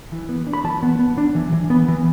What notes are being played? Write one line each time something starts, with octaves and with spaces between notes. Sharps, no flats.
E3
B3
D4
B5
E3 A5
B3
B3
D4
E3
E3
B3
E3